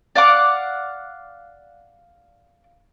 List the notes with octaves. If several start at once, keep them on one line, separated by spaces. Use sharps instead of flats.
D5 F5 F#5 D6